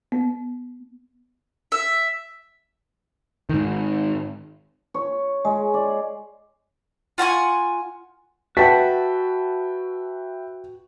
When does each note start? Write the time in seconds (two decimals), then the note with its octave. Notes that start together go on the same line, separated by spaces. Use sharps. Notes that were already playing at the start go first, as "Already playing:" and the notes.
0.12 B3
1.72 E5
3.49 G#2 D#3
4.94 C#5
5.45 G#3
5.74 D5
7.18 F4 F#5 G#5 C#6
8.57 F#4 B4 E5 F#5 G5 A5 B6